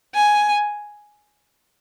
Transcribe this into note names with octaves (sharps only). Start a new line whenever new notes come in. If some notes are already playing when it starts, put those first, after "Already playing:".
G#5